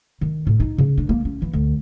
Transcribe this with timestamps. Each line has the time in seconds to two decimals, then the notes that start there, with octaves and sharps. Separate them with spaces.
0.21 D#3
0.47 A2
0.60 D#4
0.78 C#3
0.97 D4
1.09 A#3
1.25 C#4
1.42 E3
1.53 D2